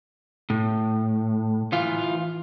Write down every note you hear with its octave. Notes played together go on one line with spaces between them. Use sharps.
A2
E3 F4